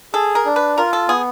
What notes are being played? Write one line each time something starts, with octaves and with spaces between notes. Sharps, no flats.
G#4 A4
A#4
D4
B4
F4 A#4
A4
B3 G#4